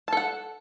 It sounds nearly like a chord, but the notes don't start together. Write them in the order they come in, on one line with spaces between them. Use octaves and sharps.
A5 A4 F#5